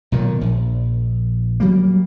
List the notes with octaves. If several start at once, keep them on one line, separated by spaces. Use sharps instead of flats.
B1 A#2 D#3
A#1
F#3 G3 A#3